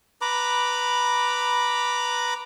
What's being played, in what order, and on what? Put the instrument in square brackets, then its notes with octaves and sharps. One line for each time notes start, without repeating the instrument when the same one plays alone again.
[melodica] B4 A#5 B5 D6